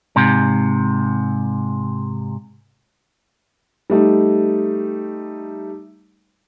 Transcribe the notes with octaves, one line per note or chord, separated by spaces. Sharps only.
G#2 C3
G3 A3 D#4